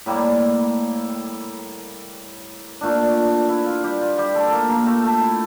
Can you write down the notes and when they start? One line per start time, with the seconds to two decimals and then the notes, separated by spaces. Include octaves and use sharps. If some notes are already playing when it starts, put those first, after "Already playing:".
0.06 A2 G3 A#3 E4
2.81 A#2 A3 D4
3.49 E4
3.66 F4
3.83 G3 G4
4.01 F4
4.18 G3 G4
4.35 A3 A4
4.48 A#3 A4 A#4
4.69 A#3 A#4
4.86 A3 A4
5.04 A3 A4
5.21 E4